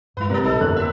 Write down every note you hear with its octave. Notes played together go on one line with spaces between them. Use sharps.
G2 G#3 E4 B4
C3 G3 A#3 A#4 B4
A#1 D#4 A4
G1 F2 A#3 F#6
E2 E5